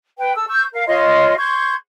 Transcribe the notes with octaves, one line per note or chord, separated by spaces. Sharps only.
B4 G5
A4 E6
C#6 E6 G6
A#4 F5
F4 C#5 D#5 C6
C6 C#6 G6 G#6